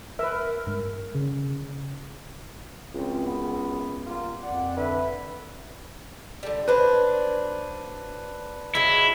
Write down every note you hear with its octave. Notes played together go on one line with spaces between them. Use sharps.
A#4 B4 E5
G2 G#3
C#3
C#2 F#2 C4
B3
G3 A#3 F4
F2 D5 F#5
D3 B4 E5
D3 G3
F#3 D4 B4 C5
C#3 F#3 G#3 E4